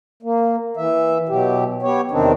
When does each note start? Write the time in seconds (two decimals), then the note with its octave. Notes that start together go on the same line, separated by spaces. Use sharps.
0.23 A#3
0.77 E3 E5
1.29 B2 F#3 G4
1.82 B3 G4 C#5
2.11 E2 C3 D#3 C4 D4 D#4